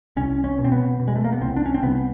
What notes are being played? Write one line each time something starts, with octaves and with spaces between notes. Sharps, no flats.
C2 C#4
C#4
B2
C4
B3
B2
G#3
A3
A#3
B3
C2 C4
D4
C#4
C4
C2 B3